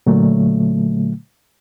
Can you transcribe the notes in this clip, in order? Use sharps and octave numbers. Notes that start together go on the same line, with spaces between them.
A#2 D3 F#3 A3